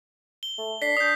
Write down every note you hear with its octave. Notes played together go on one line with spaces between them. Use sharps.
G7
A3
D4 B6 C7
D4 D#6 G6